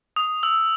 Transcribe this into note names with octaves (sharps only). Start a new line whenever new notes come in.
D#6
E6